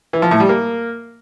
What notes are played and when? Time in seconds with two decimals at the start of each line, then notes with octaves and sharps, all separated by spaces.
0.13 E3
0.22 F3
0.31 A2
0.40 G3
0.49 A#3